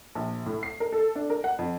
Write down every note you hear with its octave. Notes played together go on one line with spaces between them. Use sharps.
A#1
A2
C7
A#4
A4
D4
A#4
F#5
F2